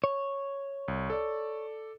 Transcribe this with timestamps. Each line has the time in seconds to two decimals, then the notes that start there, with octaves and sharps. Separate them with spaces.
0.04 C#5
0.88 C2
1.10 A4 D5